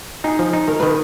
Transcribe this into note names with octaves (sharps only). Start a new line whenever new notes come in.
D#4 G#4
F3
D#4
D#3 A#4
D#3 B4